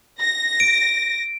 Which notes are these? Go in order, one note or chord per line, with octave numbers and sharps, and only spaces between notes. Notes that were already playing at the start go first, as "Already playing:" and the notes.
A#6
D7